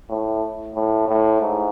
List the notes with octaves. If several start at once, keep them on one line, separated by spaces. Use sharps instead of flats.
A2
A2
A2
G#2